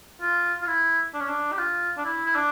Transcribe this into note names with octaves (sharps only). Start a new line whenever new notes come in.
F4
F4
E4
D4
C#4
D4
G4
F4
D4
E4
E4
D4